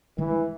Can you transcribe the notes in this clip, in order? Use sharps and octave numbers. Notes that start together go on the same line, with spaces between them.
G2 D#3 E3 G#3